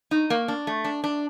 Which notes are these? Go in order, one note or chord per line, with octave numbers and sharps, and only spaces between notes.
D#4
A#3
D4
A3
D4
D4